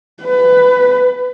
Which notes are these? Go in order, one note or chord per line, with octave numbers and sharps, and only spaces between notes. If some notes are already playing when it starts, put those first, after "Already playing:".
B4